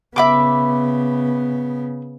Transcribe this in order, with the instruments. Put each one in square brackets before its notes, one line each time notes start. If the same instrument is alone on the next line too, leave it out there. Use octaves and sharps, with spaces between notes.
[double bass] C#3 B3 [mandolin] E5 B5 D6